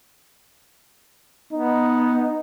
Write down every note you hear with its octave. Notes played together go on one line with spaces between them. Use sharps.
B3 D#4